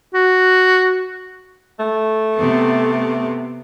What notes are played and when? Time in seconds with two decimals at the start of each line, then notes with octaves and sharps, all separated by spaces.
0.14 F#4
1.79 A3
2.36 C3 B3